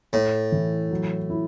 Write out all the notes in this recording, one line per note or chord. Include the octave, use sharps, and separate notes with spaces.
A2 A3
E3
F#3
E4